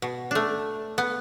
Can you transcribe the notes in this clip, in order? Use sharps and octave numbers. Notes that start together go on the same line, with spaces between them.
B2
A3 D4
B3